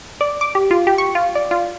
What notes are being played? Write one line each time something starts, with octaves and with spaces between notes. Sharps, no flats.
D5
D6
G4
F4
G4
C#6
F4
D5
F4